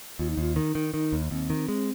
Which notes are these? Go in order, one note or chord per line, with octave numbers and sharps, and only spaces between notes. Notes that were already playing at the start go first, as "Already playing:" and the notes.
D#2 F4
D#4
D#2 F4
D#3 D#4
D#3
D#3 D#4
D#2
D#2 C4
D#3
G#3